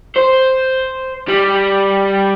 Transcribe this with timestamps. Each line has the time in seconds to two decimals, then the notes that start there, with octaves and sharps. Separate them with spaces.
0.16 C5
1.28 G3